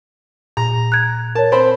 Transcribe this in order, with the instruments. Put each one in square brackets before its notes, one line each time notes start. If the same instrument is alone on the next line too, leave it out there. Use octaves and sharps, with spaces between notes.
[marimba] A#2 [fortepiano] A#5
[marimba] F#6 G#6
[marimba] A#4 C#5 [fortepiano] A5
[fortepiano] C4 C5 B5